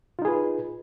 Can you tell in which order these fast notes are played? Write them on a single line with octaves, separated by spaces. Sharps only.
F4 D#4 G#4 B4